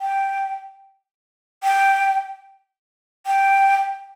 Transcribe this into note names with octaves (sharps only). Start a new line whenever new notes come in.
G5
G5
G5